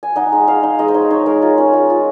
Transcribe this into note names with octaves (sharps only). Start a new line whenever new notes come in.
G#5
D#4 F#5
G#3
G#3 F5
D#4
G#3 D#5
C5
D#4 C#5
D#4 C#5
G#3 A#4
F4 G#4
C#4
G#3
F4